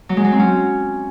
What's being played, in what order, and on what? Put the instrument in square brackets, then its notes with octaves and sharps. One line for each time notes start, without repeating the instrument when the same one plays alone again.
[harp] F#3
G#3
F#3
C4
C#4